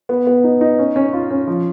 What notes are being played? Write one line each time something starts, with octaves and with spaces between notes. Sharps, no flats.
B3
B3
D#4
D#4
C#4
C#4
F4
C#4
F3